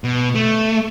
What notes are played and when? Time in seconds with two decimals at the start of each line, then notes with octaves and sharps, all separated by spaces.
0.04 B2
0.35 A3